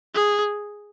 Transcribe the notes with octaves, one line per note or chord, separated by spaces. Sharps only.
G#4